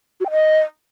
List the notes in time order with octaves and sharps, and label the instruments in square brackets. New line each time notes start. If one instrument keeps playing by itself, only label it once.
[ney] F#4
G5
D#5